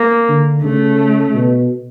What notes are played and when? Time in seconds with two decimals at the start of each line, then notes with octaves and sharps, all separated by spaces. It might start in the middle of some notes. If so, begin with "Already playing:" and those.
Already playing: A#3
0.29 D3
0.64 C#3 A3
1.35 B2